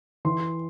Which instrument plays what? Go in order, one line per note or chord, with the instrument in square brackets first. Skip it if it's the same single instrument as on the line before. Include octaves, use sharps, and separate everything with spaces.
[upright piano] E3 C6